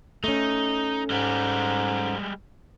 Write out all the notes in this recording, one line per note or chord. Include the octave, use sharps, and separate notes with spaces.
A3 C#4 D#4
G#2 G3 G#3 G4